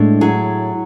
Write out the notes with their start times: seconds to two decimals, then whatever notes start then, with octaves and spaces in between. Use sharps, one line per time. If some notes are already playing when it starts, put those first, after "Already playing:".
Already playing: A2 G#3 D4
0.21 F#3 G#4